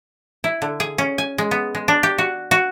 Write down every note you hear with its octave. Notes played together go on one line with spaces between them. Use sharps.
E4
D3
G#4
C#4
G#5
G#3
B3
G#3
D4
G4
F#4
F#4